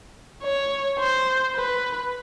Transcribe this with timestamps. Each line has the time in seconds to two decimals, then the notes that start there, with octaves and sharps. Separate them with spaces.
0.42 C#5
0.99 C5
1.56 B4